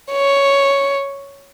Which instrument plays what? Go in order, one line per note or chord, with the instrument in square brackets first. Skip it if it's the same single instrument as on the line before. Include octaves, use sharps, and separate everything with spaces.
[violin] C#5